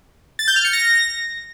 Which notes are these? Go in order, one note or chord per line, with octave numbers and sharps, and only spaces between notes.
A6
G6
F6
C#7
A#6